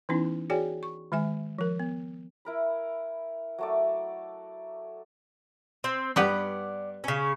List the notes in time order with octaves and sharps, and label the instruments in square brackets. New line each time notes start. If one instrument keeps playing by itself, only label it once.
[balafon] E3 B3 C#4 D#4 E4
F#4 G#4 C#5 D5 G5 G#5
C#6
D#3 G#3 E5 G#5
F3 A#4
B3
[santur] E4 A#4 B5
F#3 A3 D5
[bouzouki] C4
[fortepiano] G2 F#5 F#6 [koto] B3 G4 B4 [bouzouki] D5
[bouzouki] C#3 C#4